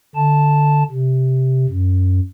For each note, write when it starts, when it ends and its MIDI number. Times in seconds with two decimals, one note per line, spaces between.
0.15 0.83 50
0.15 0.83 81
0.90 1.66 48
1.69 2.20 42